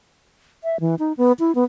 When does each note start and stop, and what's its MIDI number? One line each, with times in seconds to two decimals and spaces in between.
0.64 0.80 76
0.80 0.95 52
0.99 1.13 63
1.17 1.32 59
1.40 1.54 64
1.55 1.64 59